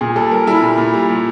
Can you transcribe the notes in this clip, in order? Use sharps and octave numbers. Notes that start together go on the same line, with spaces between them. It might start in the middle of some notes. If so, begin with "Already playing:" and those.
A#2 G#4
G3 A4
G3 A#4
G3 E4
A#2
A#2
G3
A#2